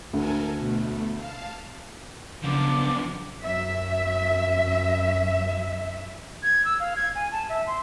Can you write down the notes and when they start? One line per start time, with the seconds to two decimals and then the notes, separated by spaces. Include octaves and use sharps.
0.13 D2 A4 A#4 G#5
0.58 B2 A3
1.17 F5 A5
2.44 F#2 C#3 F3 B3 D4 D6
3.42 F#2 E5
6.43 G#6
6.65 E6
6.80 F5
6.96 G#6
7.15 G#5
7.32 A5
7.49 E5
7.67 C6